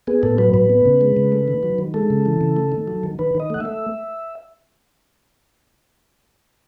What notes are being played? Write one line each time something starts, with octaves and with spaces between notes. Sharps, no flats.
B3 G#4
A2 A4
F#3 B4
A2 B4
B3
C#3
G#3
C#3
A3
D#3
F#3
D#3
G#3 A4
C#3
E3
C#3
A3
D#3
F#3
D#3
D#3 B4
D#3 D#5
A3 F#5
A3 E5